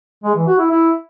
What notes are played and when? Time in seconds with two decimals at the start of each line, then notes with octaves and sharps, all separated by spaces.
0.24 G#3
0.36 E3
0.47 F#4
0.59 E4
0.70 E4